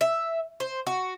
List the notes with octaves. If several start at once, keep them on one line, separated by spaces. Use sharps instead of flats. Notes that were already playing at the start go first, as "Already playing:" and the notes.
E5
C5
F#4